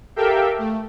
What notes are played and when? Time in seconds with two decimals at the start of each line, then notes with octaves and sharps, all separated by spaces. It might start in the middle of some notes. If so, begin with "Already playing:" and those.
0.16 G4 A4 A#4 E5 F5 G5
0.58 A3